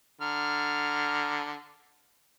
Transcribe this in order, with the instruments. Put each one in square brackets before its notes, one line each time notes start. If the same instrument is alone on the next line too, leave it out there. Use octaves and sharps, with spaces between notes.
[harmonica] D3 A#5 F6